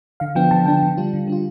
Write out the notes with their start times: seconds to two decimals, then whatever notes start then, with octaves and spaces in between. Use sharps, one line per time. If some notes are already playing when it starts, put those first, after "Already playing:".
0.20 D3 F5
0.35 F3 B3 D4 G5
0.51 D3 A5
0.66 F3 B3 D4 G5
0.83 D3
0.97 G3 D4 F4
1.13 D3
1.28 G3 D4 F4